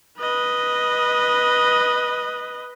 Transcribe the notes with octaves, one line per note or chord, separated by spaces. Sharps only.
B4 D#5